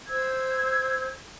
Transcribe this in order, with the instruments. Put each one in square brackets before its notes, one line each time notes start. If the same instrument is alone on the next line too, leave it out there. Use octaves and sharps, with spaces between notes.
[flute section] C5 E6 G#6